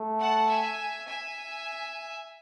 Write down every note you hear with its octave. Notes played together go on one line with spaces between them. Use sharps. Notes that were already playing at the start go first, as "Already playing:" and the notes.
Already playing: A3
F#5 A5
E5 G#5
E5 G#5